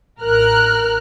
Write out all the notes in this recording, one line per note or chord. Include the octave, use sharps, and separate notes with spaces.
A1 A#4 F6 F#6